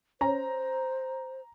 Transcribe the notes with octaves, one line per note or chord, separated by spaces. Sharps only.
C#4 C5 A#5